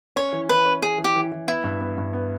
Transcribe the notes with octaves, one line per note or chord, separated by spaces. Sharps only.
C#4 C#5
E3
E3 B4
C#4
C#4 G#4
E3
G4
E3
E3
B3 E4
G2
B3
G2
B3